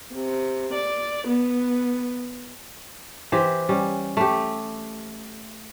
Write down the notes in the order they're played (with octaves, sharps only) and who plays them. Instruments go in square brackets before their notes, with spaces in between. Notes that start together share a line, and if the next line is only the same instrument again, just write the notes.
[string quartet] C3
D5
B3
[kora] E3 G4 C5
G3 C#4
A3 G4